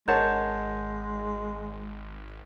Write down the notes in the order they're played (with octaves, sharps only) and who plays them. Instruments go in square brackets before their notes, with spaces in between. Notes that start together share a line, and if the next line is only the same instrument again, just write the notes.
[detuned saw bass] G#1 [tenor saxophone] G#3 [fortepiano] A#4 C#5 A5 [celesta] D#5 F#5 G6